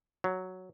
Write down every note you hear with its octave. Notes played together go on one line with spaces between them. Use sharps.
F#3